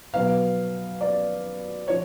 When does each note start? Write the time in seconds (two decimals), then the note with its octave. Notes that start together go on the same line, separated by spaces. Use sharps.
0.13 B2 F#3 B3 F5
1.01 D5
1.88 F3 C#5